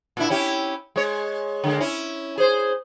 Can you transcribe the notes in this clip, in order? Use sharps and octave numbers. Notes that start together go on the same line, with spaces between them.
A#2 D4 E4
C#4 E4 G4
G#3 C#5
D3 G#3 A#3
C#4 E4
G#4 C5